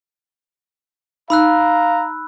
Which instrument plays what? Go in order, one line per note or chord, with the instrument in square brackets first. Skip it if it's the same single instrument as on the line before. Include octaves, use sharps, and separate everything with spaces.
[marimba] D#4 [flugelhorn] F5 [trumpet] A#5 [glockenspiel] B5 E6 F#6